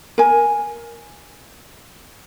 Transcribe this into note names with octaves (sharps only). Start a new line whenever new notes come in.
A#4 G#5